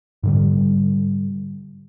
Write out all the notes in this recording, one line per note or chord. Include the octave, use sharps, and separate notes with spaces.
G#2 D3 G3